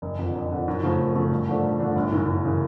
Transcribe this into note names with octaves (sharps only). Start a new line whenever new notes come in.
F#1
F2 D3
F#1
F2 D3
F#2
C#3 F3 A3
F#2
C#3 F3 A3
G2
D3 F3 A3 D4
G2
D3 F3 A3 D4
G1
F#2 C#3 E3
G1
C#3 E3